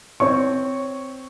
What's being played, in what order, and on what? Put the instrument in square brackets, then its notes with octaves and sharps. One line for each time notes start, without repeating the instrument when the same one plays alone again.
[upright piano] C4 C#5 C#6